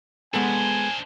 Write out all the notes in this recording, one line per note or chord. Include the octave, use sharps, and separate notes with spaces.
G#3 B3 D4 A4 C5 G#5